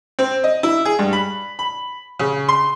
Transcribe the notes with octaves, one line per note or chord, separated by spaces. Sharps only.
C4
D#5
E4
G#4
G2
B5
B5
C#3
C6